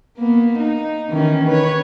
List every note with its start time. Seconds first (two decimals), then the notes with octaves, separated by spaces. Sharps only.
0.17 A#3 B3
0.58 D#4
1.10 D#3 E3 C#4
1.48 B4 C#5